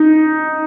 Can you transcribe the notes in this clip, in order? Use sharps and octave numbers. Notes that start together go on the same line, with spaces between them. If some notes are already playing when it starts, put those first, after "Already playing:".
Already playing: D#4